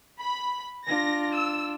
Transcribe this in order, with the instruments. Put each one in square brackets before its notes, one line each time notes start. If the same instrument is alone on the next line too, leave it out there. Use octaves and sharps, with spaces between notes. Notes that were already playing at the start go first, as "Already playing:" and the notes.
[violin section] B5
[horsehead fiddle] D4 F4 [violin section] A#6
[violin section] E6